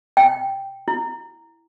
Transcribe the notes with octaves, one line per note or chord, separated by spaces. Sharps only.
G5
E4